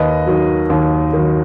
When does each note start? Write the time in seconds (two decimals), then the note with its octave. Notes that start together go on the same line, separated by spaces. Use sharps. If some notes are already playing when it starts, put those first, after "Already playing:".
Already playing: D#2 B4 D#5
0.26 D#3 F#3
0.70 D#2
1.13 D#3 F#3